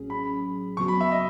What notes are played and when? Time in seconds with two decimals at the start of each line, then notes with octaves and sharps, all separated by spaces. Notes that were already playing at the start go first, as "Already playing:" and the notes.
Already playing: A1 A2 F#3 C#4 G#4
0.10 B5
0.77 D#2 C#3 F#3 B3 F#4 C#6
0.88 B5
1.01 E5
1.12 D#5